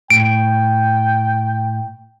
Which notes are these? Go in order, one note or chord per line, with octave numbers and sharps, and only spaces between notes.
A2 G5 D7